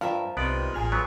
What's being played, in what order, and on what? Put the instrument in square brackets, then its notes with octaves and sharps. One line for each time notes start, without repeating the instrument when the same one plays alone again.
[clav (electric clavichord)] G2 [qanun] F3 A#4 E5 [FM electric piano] F5
[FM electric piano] C2 [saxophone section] G2 C3 D#3 [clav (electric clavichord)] B3 D5
[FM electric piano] A1 G#5 F6 [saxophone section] A#2 G#4
[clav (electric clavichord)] F#3 B3